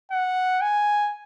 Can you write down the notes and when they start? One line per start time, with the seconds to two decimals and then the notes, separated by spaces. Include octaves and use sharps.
0.11 F#5
0.61 G#5